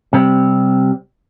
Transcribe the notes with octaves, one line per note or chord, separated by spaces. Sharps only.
C3 G3 C4